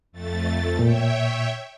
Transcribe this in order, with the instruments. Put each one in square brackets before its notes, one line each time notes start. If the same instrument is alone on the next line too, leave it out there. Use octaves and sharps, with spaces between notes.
[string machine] F2 A3 A6
[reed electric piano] A#2 [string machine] C#5 E5 G5